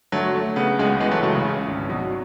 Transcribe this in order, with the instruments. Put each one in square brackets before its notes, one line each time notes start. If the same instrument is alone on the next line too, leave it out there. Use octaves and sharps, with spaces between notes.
[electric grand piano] D3 [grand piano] F#3 A3
[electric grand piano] A3
[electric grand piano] C#3 [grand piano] B3
[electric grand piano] C#2 [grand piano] G#3 B3
[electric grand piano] E3 [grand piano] G#3 B3
[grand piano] F#3 A3
[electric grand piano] C#2 [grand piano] F#3 A3
[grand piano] C#3
[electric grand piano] C#4
G#1
[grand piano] B2 [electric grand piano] F#3